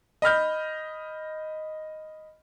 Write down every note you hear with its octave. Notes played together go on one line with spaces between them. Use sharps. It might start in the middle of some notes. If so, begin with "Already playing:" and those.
D#5 B5 F6 G6